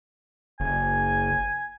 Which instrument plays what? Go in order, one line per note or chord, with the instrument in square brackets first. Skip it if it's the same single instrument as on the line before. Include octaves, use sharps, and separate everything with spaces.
[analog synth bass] F#1 [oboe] G#5